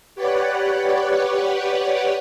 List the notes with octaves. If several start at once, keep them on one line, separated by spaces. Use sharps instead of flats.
G4 B4 C#5 D5 F#5